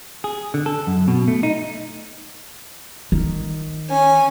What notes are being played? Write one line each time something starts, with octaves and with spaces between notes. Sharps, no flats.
G#4
D3
A4
F#2
B2
A3
D#4
D#3
C#4 G#5